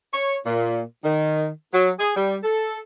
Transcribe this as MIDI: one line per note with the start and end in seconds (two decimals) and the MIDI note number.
0.13 0.35 73
0.44 0.81 46
1.03 1.48 51
1.72 1.89 54
1.99 2.15 68
2.15 2.36 55
2.43 2.79 69